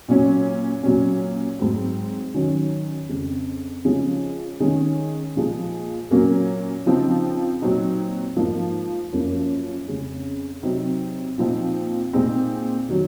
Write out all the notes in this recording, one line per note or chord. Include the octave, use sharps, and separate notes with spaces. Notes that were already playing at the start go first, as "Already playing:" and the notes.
A#2 F#3 C#4
A#2 F#3 C#4
G#2 F#3 C4
D#3 F#3 C#4
F2 C#3 G#3
C#3 F3 G#3 C#4
D#3 G#3 C#4
A#2 F3 G#3
A#2 F#3 A#3 C#4
C#3 F3 C4 D#4
A#2 F#3 C4 D#4
G#2 F3 A#3 D#4
F#2 F3 A#3 C#4
F2 C#3 G#3 C#4
C3 F#3 C4 D#4
A#2 F3 C4 D#4
A#2 G#3 C4 D#4
D#3 F#3